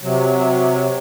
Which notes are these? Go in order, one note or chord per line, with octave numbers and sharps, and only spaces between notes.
C3 F#3